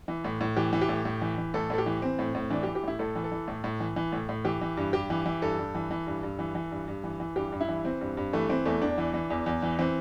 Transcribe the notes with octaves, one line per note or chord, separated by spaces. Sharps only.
E3
A2
A2
E3 G4
E3
G4
A2
A2
E3
E3
A2 A4
A2 A4
G4
E3
E3 C4
A2
A2
E3 D4
G4
E3
G4
A2 E4
A2 A4
E3
A4
E3
A2
A2
E3
E3
A2
A2
E3 G4
E3
G2
G2 G4
E3
E3
G2 A4
G2
E3
E3
G2
G2
E3
E3
G2
G2
E3
E3
G2 G4
G2
E4
E3
E3 C4
G2
G2
E3 A3
E3 C4
E2 A3
E2 D4
E3
E3
E2
E2
E3
E3 C4